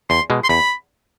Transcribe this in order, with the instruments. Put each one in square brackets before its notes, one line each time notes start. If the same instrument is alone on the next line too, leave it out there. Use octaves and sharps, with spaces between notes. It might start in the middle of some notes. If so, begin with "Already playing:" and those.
[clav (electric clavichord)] E2 [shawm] C6
[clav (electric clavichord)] B2 G#3
[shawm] C6
[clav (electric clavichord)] E2 [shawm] B5